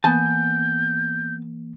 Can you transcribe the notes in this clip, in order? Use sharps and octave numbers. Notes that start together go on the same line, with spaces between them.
E3 A#3 B3 G#5 A5 G6